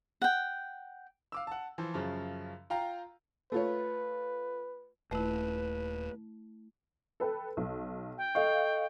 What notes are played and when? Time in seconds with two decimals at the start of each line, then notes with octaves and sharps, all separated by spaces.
0.22 F#5 G5
1.32 F5 D6 E6
1.47 F#5 A5
1.78 E3 F3 C5
1.94 F#2 C#3 F3
2.70 F4 F5 G5 A#5
3.52 A3 F4 B4 C#5
5.11 D#1 A3 E4 B4
7.20 A4 B4 G5
7.57 B1
8.18 G5
8.35 A4 D#5 F5 C#6